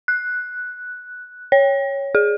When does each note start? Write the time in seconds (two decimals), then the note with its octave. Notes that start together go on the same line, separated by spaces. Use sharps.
0.08 F#6
1.52 C#5
2.15 G#4